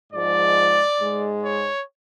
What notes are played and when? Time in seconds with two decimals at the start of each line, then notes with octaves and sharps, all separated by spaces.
0.12 G#2 F3 G#3 D5
1.00 G#2 G#3
1.44 C#5